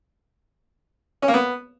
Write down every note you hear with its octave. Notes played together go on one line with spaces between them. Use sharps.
C#4
A#3
B3